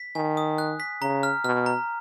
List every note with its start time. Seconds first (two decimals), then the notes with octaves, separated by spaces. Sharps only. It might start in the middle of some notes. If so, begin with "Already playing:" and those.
Already playing: B6
0.15 D#3 G#5
0.37 D#6
0.58 F#6
0.80 B6
1.01 C#3 A#5
1.23 F6
1.44 B2 F6
1.66 A#5